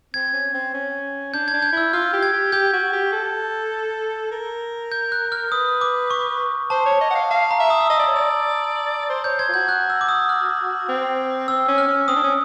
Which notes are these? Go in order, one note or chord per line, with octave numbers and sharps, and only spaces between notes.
C4 G#6
C#4
C4
C#4
D4 G6
G#6
D4
G6
E4 E6
F4 F6
G4
G#6
G4
G4 G6
F#4
G4
A4
A#4
G6
F#6
F6
B4 D#6
D6
C#6
C5 A5
C#5
D#5
F#5
F5
F5 A5
A#5
E5
D#6
E6
D#5 D#6
D5
C#5
D5
C5
C#5 G6
C5 G#6
F4
F#4 G6
F#6
E6
D6
D#6
F6
C4
C4 E6
C#4
F6
C#4
C4 D#6
D4
C#4